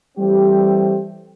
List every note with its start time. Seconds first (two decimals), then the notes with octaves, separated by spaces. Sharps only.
0.18 E3 G3 A3 C4 G4 C5